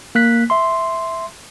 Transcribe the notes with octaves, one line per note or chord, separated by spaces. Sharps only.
A#3 F#6 B6
E5 C6